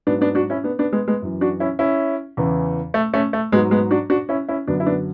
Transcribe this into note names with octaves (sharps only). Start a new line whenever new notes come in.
G#2 F#3 B3 D4
B3 D4
D4 F#4
C#4 E4
B3 D4
B3 D4
G#3 B3
G#3 B3
F#2 E3
D4 F#4
C#4 E4
C#4 E4
E2 C#3 E3
A3
A3 C#4
A3
G#2 F#3 G#3 B3
G#3 B3
D4 F#4
D4 F#4
C#4 E4
C#4 E4
F#2 D3 F#3 B3 D4
E4
B3 D4